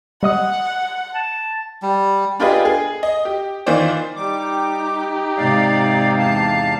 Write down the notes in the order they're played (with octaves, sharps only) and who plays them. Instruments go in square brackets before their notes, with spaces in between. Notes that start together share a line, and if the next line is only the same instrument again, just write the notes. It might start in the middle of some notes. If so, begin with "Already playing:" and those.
[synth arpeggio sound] G3 D#5 D#6 [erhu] F#5
[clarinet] A5
[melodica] G3
[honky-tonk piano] D4 F4 G4 G#4 B4 D#5
G#4
D#5
G4
D#3 E3 F4 C5 D5
[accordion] G3 D6 [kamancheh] D#4 G4
[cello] G#2 C3 [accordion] D5 F5
[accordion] E2 F5 A5